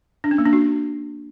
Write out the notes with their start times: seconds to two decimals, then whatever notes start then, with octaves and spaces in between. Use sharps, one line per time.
0.24 D4
0.31 C#4
0.38 A#3
0.46 D4
0.53 F#4